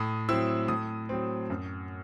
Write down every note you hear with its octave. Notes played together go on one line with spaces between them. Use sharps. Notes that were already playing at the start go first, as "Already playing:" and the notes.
Already playing: A2 D#6
F#3 C4 E4 E6
A2 D#6
F#3 C4
F#2